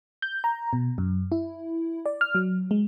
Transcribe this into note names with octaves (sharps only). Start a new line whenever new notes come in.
G6
A#5
B2
F#2
E4
D5
F6
F#3
G#3